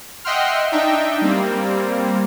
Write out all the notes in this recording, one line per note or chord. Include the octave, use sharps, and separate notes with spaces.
D#5 E5 F#5 G5 C6 F6
D4 D#4 E5 G5
G3 A#3 C4